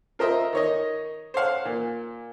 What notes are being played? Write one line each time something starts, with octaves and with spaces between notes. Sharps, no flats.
F4 A#4 C5 D#5 E5
D#3 C#5 D#5
C5 C#5 F5 F#5
A#2